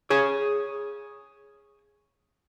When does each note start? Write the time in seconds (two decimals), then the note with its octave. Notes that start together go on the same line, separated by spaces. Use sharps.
0.10 G#4 C#5